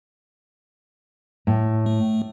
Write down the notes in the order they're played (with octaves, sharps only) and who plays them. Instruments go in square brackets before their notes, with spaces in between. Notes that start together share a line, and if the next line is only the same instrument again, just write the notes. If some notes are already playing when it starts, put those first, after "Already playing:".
[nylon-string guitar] A2
[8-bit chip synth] A3